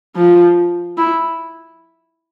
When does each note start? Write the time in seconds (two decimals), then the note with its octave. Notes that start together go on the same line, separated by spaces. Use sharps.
0.16 F3
0.98 E4